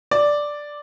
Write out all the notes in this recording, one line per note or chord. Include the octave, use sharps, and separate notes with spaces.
D5